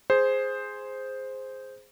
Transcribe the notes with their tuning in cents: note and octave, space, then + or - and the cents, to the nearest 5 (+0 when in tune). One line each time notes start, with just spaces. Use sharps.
G#4 +0 C5 +0